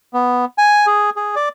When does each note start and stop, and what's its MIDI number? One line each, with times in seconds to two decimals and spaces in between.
0.14 0.45 59
0.58 0.86 80
0.87 1.10 68
1.16 1.35 68
1.36 1.49 74